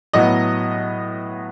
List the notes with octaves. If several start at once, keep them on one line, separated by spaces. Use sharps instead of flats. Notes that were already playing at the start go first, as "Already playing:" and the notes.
A2 F#3 B3 D#5